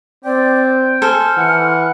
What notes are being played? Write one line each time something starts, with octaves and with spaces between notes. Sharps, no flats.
C4 D5 G5
A4 C5 G#5 F6
E3 F#5